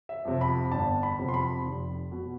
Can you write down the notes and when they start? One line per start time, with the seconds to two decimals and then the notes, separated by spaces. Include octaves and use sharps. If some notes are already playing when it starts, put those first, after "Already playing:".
0.09 E5
0.25 F2 C3
0.41 B5
0.72 G1 A5
1.03 B5
1.19 F2 C3
1.28 C6
1.34 B5
1.65 F1
2.12 B2